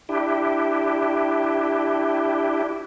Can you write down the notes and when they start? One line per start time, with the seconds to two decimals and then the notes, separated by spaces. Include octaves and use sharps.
0.09 D4 E4 G4